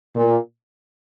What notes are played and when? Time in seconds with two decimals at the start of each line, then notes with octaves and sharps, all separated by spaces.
0.15 A#2